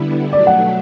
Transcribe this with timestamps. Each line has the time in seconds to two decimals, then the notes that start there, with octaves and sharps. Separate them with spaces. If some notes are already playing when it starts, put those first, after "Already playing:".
Already playing: D3 G3 B3 E4
0.32 B2 F#3 A3 D4 D5
0.47 F#5